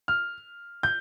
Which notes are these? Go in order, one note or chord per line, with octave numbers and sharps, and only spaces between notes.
F6
G6